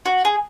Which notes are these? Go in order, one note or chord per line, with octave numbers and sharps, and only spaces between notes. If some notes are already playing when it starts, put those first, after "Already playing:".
F#4
G#4